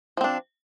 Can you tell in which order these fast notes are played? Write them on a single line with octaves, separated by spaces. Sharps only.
F3 C4 D4